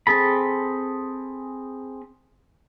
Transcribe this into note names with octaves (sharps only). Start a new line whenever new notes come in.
C4 G#4 A4 B5